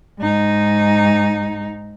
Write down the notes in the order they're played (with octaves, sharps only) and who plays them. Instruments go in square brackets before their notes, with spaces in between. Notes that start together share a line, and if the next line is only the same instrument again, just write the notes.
[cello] G#2 D#4